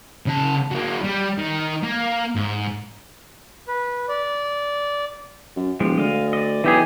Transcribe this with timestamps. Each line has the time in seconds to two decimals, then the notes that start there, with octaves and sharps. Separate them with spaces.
0.26 C#3 A5
0.71 F#3 A#3
1.04 G3
1.38 D#3
1.84 A#3
2.35 G#2
3.68 B4
4.08 D5
5.56 F#2
5.80 E1 F3 G#3 G4
5.98 D2 D#5 F5
6.33 D5 D#5
6.64 B1 E3 G4 G#4